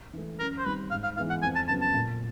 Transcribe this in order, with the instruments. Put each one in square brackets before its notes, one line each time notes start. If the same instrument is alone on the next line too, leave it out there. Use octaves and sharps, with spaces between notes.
[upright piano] E3 A3
[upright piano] F#2 [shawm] A#4
[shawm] C5
[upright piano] D#3 G3 C4 D#4 [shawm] B4
[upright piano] G#2 [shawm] F5
[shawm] F5
[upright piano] E3 G#3 B3 E4 [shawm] F5
[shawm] F#5
[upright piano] F2 [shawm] G#5
[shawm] A5
[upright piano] C#3 F#3 B3 [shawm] A5
[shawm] A5
[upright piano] A#2